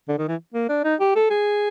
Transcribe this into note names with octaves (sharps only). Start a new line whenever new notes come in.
D3
D#3
E3
A#3
D4
D#4
G4
A4
G#4